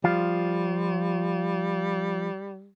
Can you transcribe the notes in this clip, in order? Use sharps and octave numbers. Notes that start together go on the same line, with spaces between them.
F3 G3 F4